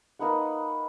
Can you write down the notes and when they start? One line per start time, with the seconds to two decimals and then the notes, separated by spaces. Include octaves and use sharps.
0.19 A#3 D#4 B4 F#5